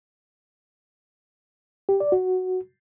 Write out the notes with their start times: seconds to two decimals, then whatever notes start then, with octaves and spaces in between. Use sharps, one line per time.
1.89 G4
2.00 D5
2.12 F#4